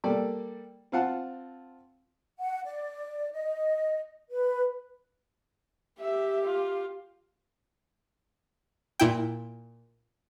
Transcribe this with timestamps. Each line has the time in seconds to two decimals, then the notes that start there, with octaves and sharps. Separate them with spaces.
0.04 G3 A#3 A4 D5
0.92 C4 F4 F5 F#5 A5
2.39 F#5
2.65 D5
3.31 D#5
4.31 B4
6.00 G4 E5
6.46 F4
9.00 A#2 E4 G5